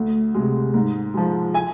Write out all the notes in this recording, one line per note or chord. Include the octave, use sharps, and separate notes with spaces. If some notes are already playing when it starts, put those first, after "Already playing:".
Already playing: D2
C3 G#3
G#2
F3 G#3
G#5